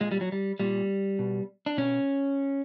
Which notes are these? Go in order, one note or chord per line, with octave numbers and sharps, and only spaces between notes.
A#2 G#3
G3
F#3
G3
A#2 G3
B2
D4
B2 C#4